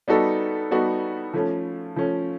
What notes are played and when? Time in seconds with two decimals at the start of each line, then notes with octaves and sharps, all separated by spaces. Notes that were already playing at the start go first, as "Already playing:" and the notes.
0.08 G3 B3 D#4 F#4 A4
0.71 G3 B3 D#4 F#4 A4
1.33 F3 A3 C#4
1.96 F3 A3 C#4